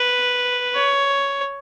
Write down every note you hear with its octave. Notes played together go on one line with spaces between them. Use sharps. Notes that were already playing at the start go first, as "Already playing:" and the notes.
Already playing: B4
C#5